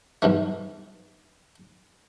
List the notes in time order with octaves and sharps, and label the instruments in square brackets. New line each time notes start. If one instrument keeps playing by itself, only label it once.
[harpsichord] B1 G2 E3 A3